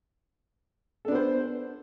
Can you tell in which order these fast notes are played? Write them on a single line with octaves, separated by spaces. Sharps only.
A4 D4 B3 C5